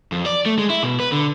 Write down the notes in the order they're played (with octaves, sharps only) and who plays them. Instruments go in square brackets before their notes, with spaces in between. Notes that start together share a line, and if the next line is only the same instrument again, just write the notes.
[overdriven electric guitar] F2
D5
A3
G#3
E4
B2
B4
D3